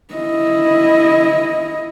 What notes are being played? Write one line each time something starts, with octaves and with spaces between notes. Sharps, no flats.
E4 D#5